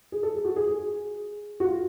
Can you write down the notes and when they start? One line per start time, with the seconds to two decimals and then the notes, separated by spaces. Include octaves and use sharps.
0.12 G#4
0.23 A4
0.35 G#4
0.45 F#4
0.56 G#4
0.67 G#4
1.60 F#4
1.65 F4